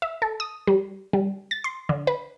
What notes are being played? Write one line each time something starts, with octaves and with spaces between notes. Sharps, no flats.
E5
A4
D#6
G3
G3
A6
C6
D3
B4